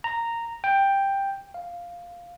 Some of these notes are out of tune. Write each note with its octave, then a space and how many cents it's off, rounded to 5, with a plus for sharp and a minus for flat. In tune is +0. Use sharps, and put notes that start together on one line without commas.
A#5 -10
G5 +5
F5 +0